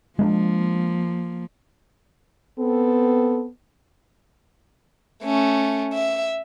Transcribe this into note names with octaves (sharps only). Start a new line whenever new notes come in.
F3 G#3 A#3 B3 D4
B3 C4 A4
A3 C#4
E5